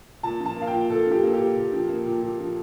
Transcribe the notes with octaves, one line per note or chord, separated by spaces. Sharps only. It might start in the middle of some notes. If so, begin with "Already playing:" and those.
A#2 A5
F3
A5
A#3 F5
G5
A#2
A#2 A4
F3 G4
A#3
G4
A#2
A#2
F3
A#3
A#2
A#2
F3